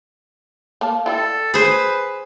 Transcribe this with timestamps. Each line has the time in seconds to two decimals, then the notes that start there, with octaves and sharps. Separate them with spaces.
0.81 A#3 F5 A5
1.06 E4 A4 D5 G5
1.54 G#4 B4 C5